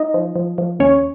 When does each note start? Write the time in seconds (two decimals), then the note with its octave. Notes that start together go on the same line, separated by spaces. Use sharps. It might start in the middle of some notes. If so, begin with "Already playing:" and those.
Already playing: D#4 D#5
0.14 F3
0.36 F3
0.58 F3
0.79 D#2 C#4 C#5